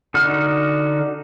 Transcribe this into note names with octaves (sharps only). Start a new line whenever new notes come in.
D3 D#4 F#4 F6